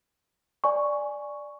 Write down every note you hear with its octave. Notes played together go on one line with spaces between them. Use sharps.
D5 G#5 C#6